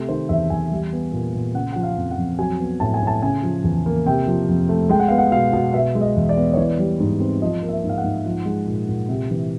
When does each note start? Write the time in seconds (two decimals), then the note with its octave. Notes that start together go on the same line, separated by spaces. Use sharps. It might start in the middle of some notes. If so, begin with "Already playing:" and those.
Already playing: C3 A3
0.09 D#3 C5
0.29 E2 E5
0.50 E2 G#5
0.71 G3
0.93 B3
1.12 A#2
1.34 A#2
1.54 C#3 F#5
1.73 F3 F#5
1.83 F5
1.97 F2
2.11 F#5
2.17 F2
2.39 F#3 G#5
2.60 B3
2.80 A2 A5
2.94 G#5
3.02 A2 A5
3.22 C#3 G#5
3.43 F3
3.64 E2
3.86 A#3
4.06 C3 G5
4.27 F3
4.49 F2
4.69 A3
4.89 G#3 G5
5.00 F#5
5.08 B3 F5
5.18 F#5
5.31 B2 F5
5.53 B2
5.73 B2 E5
5.95 G#3
6.01 D#5
6.16 E2
6.29 D5
6.37 B3
6.54 C#5
6.57 E3 D5
6.79 G3
7.00 G#2
7.20 C4
7.41 F3 D#5
7.63 A#3
7.69 E5
7.84 G#2
7.89 F5
7.98 F#5
8.04 G#2
8.26 F3
8.46 G#3
8.67 A#2
8.89 A#2
9.08 C3
9.30 E3